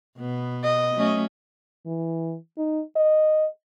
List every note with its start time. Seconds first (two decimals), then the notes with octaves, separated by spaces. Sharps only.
0.18 B2 B3
0.64 D#5
0.95 F#3 A3 C#4
1.86 E3
2.58 D#4
2.96 D#5